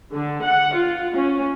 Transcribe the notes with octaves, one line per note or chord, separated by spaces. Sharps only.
D3
F#5
F4
C#4